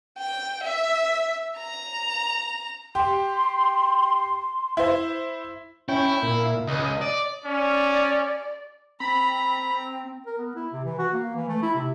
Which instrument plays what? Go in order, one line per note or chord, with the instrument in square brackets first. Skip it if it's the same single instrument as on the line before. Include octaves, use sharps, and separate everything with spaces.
[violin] G5
E5
A#5
[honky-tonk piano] G4 [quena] C6
[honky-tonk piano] E4 C5
[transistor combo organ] C#4 G5 [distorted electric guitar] E4
[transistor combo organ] A#2
[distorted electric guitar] C#2 [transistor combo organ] D#5
[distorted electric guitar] D5
[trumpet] C#4 [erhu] D5
[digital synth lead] C4 [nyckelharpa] A#5 [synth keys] B5
[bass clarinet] A#4
B3
E4
C3
E3
F#4
A#3
E3
A3
E4
C3